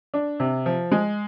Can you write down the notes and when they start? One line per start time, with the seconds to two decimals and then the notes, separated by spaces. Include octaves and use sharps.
0.14 D4
0.40 C3
0.66 F3
0.92 G#3